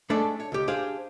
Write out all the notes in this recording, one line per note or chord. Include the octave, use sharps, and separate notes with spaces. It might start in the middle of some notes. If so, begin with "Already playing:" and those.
G#3 A3 D4 A4 D5 E5
C#5
C#2 G4
D4 G4 G#4 C5 F5